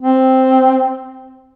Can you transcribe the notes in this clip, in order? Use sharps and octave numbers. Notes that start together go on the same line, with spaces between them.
C4